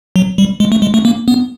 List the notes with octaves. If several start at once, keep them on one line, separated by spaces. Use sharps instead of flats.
F#3
G3
G#3
A3
G#3
A3
A#3
B3